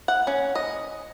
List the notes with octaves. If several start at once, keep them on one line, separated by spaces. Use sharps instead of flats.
F#5
C#4
D#5